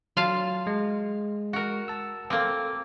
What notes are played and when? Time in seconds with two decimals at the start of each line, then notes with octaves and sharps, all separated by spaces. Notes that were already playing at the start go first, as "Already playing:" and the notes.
0.17 F#3 F4 F5 A5
0.67 G#3
1.53 F#4 A#4
1.88 A5 E6
2.30 A#3 C4 A4 D6